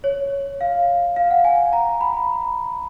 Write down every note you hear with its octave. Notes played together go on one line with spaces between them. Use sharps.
C#5
F5
F5
F#5
G#5
A#5
B5